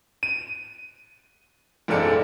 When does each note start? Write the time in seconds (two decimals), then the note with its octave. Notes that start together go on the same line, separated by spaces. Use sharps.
0.23 D#7
1.88 F#1 B1 G#2 A4 D5 C#7